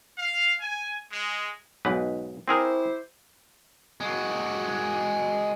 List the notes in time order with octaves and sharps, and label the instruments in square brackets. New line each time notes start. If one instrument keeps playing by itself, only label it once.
[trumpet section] F5
G#5
G#3
[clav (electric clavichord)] B1 G#2 B4
[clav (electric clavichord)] C4 G#4 A#4 [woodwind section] E4 G4 C5
[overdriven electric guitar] G#3 F#4